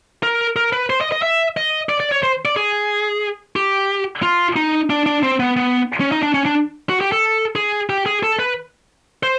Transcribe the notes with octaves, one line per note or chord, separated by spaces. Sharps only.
A#4
A#4
B4
C5
D#5
D#5
E5
D#5
D5
D5
C#5
C5
D5
G#4
G4
F4
D#4
D4
D4
C4
B3
B3
C#4
D#4
D4
C#4
D4
F#4
G4
A4
G#4
G4
G#4
A4
B4
C5